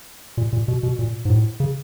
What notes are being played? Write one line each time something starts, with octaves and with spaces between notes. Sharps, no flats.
A#2
A#2
B2
B2
A#2
G#2
A2
C#3